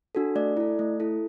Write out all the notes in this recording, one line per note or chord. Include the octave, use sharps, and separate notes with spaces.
D4 F#4 A4
A3 D5
E4 A4
A3
E4 A4